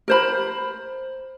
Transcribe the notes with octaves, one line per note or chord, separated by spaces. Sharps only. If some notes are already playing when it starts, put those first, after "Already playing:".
A#4 C5 B5